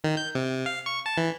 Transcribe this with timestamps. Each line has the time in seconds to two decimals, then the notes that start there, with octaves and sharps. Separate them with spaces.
0.04 D#3
0.17 G6
0.35 C3
0.66 F5
0.86 C#6
1.06 A5
1.17 E3